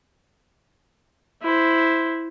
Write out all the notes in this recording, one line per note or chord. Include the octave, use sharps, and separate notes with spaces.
E4 C5